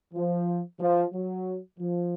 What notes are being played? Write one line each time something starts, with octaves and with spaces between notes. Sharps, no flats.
F3
F3
F#3
F3